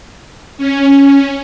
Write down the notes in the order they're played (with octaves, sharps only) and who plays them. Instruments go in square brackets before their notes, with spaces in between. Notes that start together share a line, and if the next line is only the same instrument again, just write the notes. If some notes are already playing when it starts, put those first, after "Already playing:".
[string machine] C#4